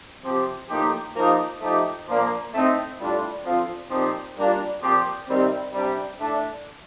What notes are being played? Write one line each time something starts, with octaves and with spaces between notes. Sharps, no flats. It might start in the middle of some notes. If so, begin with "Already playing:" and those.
C3 F3 C4 G4
A2 F3 A#3 D#4 G4
F3 A#3 D#4 G4
F3 A3 D#4 G4
A#2 F3 A#3 D4
A2 A3 C4 D#4
A2 G3 D4 F4
D3 F3 C4 F4
A#2 F3 C4 D#4 G4
G3 A#3 D4 F4
A#2 F3 C4 G4
C3 D#3 G3 C4
C3 G3 D4 G4
A2 A3 D4